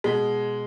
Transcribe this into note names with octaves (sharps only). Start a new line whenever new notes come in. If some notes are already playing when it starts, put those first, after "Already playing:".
B2 G#3